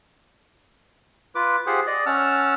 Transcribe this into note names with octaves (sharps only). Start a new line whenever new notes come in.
F4 B4 D6
F4 G4 G#4 C5 F#5
D5 D#5
C#4 F#5 A5 E6 F6